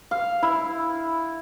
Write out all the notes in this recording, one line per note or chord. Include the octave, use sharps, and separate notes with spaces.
F5
E4